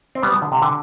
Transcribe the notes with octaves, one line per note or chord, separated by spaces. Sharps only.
C4
G3 B3
D3
C3
D3